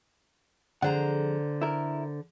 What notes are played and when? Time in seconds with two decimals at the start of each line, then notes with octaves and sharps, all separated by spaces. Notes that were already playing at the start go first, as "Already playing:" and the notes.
0.82 F2 D3 G#4 C5 F#5 A#5
1.62 E4 A#4